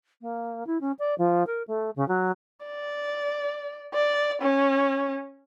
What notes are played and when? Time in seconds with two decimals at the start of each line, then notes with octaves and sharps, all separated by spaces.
0.21 A#3
0.67 E4
0.81 C#4
0.99 D5
1.18 F3
1.47 A#4
1.67 A3
1.96 C#3
2.08 F#3
2.66 D5
3.94 D5
4.42 C#4